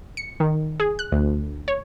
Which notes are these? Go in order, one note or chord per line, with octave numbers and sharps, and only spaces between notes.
C#7
D#3
G#4
F#6
D2
C#5